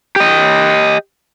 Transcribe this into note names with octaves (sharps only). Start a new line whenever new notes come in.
G4 D#5